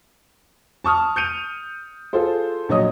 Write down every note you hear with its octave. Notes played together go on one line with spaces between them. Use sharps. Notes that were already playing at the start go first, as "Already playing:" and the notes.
A5 C#6 D#6 F6
G6 C#7 D#7 F7
F4 G#4 A4 C5
A#1 F#3 C#5 D#5 D#6